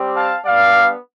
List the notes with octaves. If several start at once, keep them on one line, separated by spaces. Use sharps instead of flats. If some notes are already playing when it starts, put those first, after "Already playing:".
Already playing: G3 C4 G4
F5 A5
G3 B3 D4 D5 F5